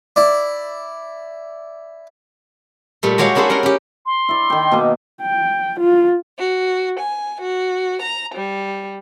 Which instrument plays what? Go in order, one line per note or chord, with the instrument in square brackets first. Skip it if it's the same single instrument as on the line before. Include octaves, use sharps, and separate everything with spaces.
[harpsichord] E4 D5
[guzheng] A#2 G3 A3
G#3 F#4 G4 C#5 F5
A#3 D4 E4 G#4 A4 C5
C#4 A#4 F#5 G5 A#5
C#4 G4
[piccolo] C6
[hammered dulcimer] E4 D5
D#3 G5
B2 A#3
[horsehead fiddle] G5
F4
[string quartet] F#4
G#5
F#4
A#5
G3